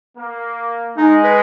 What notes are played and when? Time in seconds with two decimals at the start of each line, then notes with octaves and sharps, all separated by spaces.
0.16 A#3
0.97 G#3 D#4
1.24 B4